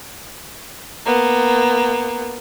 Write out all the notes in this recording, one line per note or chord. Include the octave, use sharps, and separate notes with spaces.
A#3 B3